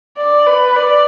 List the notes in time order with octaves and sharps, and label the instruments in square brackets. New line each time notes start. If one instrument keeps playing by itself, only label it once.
[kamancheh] D5
B4
D5